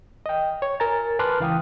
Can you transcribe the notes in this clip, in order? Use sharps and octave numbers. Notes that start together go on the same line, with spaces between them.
D#5 G5
C#5
A#4 G#5 A#5 A6
B4 A5 C6 D6 F6 F#6
C#2 E3 F5 G5 D#6